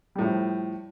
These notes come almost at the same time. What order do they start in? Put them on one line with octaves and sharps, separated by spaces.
G3 A2 F3